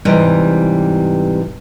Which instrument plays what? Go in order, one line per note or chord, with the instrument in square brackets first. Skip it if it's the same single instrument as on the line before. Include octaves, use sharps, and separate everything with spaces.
[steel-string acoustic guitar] G#2 C3 E3 G3